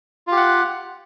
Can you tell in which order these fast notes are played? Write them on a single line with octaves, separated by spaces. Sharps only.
F4 G4 F#5